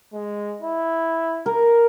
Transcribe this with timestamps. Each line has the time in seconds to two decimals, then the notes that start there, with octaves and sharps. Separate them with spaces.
0.13 G#3
0.62 E4
1.46 A#4